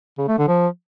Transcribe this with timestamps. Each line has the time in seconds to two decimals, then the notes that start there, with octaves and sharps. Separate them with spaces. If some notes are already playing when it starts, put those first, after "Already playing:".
0.18 C#3
0.28 A3
0.38 D3
0.48 F3